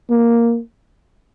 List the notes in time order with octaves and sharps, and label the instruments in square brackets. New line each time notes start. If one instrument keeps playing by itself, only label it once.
[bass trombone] A#3